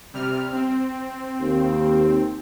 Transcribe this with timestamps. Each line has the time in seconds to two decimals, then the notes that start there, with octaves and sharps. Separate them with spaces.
0.13 C3 G3 F6
0.53 C4
1.40 D#2